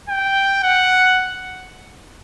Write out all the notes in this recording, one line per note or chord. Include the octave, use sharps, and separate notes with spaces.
G5
F#5